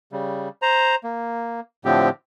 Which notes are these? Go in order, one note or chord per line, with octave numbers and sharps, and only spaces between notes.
C#3 G3
C5 A#5
A#3
A2 D3 F3 C4 G4